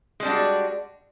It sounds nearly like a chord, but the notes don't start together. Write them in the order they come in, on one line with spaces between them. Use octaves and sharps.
G#3 G3 D4 F#4